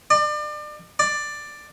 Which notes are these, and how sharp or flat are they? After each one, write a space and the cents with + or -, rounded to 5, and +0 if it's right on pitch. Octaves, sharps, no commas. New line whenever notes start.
D5 +35
D5 +10